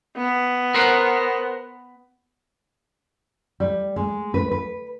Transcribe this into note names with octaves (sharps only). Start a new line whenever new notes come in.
B3
A#4 C5 F#5
G3
G#3
B4
B4